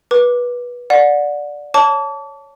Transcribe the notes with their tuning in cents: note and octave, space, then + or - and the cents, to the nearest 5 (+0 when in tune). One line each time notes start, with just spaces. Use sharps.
B4 -20 D6 +0
D5 +0 F#5 -25
C#5 +0 A5 +0 D6 -40